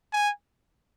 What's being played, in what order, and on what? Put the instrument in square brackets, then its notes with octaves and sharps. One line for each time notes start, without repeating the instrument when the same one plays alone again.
[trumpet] G#5